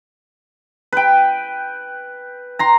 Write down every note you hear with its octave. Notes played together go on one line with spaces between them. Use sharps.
B4 G5
A#5 C6